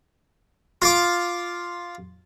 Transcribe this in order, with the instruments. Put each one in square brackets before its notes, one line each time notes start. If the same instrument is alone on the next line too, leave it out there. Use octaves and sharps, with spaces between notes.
[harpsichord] F4 D6